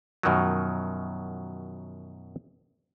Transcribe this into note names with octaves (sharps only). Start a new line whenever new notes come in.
F#2 B2 D#3 F3 F#3